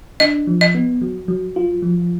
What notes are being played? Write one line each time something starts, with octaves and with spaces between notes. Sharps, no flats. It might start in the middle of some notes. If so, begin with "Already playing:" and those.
D4 D#5
F3
D#5
B3
F#3
F#3
F4
F3